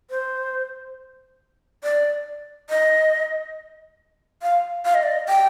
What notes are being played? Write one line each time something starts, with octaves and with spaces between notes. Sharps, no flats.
C5
D5
D#5
F5
F5
D#5
D5
D#5
G5